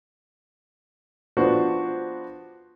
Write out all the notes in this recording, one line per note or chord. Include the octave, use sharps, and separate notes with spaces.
F3 B3 D4 F#4 C5